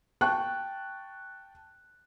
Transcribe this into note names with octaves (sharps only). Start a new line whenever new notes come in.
G5 A5 C#6 F#6